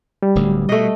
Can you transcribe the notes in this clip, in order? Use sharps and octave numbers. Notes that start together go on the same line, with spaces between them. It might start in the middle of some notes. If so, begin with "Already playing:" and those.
G3
D1 D2
B2 A3 D#5